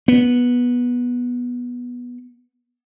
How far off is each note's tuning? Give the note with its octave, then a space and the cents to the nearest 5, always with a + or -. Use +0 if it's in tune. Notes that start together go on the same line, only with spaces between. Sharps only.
B3 -10